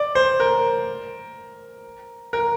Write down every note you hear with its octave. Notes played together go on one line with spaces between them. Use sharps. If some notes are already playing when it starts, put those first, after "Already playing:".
Already playing: D5
C5
A#4
A#4